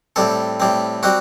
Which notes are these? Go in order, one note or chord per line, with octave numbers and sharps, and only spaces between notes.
A2 G3 C4 A4
A2 G3 C4
G3 C4 F#4